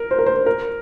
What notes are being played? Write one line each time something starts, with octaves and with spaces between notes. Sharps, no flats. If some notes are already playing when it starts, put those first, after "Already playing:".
Already playing: A#4
C5
A#4
C5
A#4